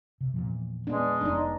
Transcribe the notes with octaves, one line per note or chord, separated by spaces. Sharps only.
C3
E2 A#2 F3
G#3 B3 D4
F1 D4 D#4